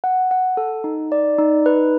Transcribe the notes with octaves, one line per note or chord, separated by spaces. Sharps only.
F#5
F#5
A4
D#4
D5
D#4
B4